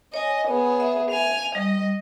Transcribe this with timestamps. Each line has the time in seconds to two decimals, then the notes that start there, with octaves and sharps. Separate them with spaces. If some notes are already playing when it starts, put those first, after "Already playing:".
0.14 C#5 D#5 G#5
0.47 B3 G#4
0.80 E5
1.11 G#5 F7
1.55 G3 D#5